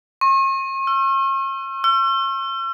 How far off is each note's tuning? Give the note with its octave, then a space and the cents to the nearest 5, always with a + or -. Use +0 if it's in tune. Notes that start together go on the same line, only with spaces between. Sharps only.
C#6 -45
E6 +45
E6 +45